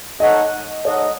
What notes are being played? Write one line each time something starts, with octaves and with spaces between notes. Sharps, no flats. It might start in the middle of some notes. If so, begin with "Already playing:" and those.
D#4 A4 C#5 D#5 F#5
D#4 A4 C#5 D#5 F#5